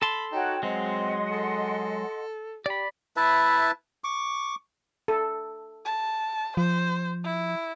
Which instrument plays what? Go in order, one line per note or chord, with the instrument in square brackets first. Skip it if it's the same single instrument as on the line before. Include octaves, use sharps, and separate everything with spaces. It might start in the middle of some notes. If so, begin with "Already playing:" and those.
[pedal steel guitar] A4 A5 C6 [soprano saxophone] B5
[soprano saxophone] D#4 [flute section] F#4 C#5 G5
[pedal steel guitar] F#3 G#3 [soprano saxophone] C4 [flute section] D#5 F#5 C6
[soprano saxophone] A4
[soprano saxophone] G4 [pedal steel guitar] D5 B5
[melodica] E4 B4 E5 A5
C#6 D6
[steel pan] A4
[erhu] A5
[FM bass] F3 [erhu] C5
[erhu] E4